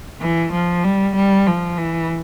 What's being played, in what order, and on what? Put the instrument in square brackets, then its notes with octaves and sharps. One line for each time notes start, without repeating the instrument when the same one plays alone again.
[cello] E3
F3
G3
G3
F3
E3